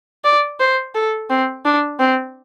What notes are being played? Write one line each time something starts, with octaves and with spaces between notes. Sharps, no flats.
D5
C5
A4
C4
D4
C4